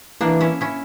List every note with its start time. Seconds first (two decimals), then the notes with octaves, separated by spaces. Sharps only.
0.21 E3 A#3 D4
0.41 C#4 E4
0.61 C#4 E4